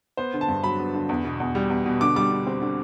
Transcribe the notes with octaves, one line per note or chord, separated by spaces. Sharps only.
B3 C5
D3
A5
G2
F#3 B5
B3
D3
E2
B2
E2
G3
E2
B2
D3 D6
G3 D6
D3
C4
D3